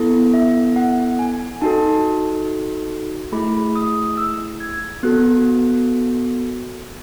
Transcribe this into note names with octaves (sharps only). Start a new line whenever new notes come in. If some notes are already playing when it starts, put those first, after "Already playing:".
Already playing: B3 E4 A4
E5
F#5
G#5
D#4 F#4 A4 A5
A3 E4 G#4 B5
D#6
E6
G#6
B3 F#4 A4 F#6